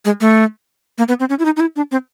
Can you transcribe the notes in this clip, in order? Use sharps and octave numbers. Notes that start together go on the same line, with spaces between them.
G#3
A3
A#3
B3
C4
C#4
E4
D#4
D#4
E4
D4
C4